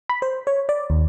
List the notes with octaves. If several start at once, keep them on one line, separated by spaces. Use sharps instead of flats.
B5
C5
C#5
D5
D#2